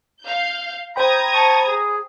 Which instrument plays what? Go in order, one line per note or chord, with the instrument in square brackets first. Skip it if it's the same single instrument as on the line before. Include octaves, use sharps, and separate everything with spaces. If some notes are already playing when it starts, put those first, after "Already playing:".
[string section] F5 G6
[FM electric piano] C5 G5 B5 [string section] A#5 D#6 G#6
[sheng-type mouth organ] A5 C#6
G#4